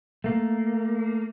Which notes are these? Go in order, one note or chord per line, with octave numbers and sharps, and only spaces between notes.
A3 A#3